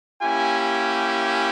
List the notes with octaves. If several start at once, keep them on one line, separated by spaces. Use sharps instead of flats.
A#3 C#4 E4 G4 G#5